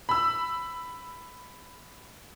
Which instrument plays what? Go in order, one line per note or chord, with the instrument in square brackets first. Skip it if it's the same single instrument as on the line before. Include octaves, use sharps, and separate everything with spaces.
[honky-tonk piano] B5 E6